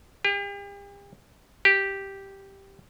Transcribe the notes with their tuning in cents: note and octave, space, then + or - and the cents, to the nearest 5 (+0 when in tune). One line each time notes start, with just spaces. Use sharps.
G4 +40
G4 -5